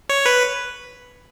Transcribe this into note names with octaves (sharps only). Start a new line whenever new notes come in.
C#5
B4